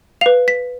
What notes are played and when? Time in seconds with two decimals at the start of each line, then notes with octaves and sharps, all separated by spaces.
0.21 B4 F5 F7
0.48 B6